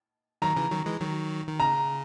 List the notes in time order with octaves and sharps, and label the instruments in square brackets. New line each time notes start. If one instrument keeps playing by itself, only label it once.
[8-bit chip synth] D#3 F#3 [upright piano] A#5
[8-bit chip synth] C#3 E3
D#3 F#3
E3 G#3
D#3 F#3
D#3
[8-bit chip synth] C#3 [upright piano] A#5